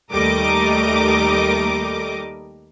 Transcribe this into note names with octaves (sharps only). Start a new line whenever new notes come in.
D#2 G3 A3 A#4 D#5 D6